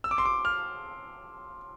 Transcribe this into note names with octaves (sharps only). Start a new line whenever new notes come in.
E6
D6
C6
D6
F6